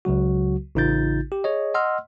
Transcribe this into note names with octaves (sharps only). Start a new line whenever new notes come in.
C#2 C#3 F#3 F#4
A1 C#3 D#4 F4 G6 A6
G4
G#4 C#5 D#5
D#5 F#5 C6 E6 F6